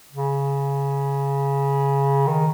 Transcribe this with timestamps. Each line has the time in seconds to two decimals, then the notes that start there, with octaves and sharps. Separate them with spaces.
0.12 C#3
2.27 D#3